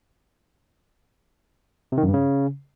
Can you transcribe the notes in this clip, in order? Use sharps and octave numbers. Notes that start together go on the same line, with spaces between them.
C3
D#3
F#2
G2
C#3